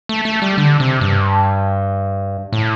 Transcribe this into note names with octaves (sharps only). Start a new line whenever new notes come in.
A3
A3
G3
D3
C3
G2
A2